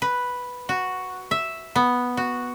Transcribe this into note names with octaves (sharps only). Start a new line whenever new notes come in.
B4
F#4
E5
B3
F#4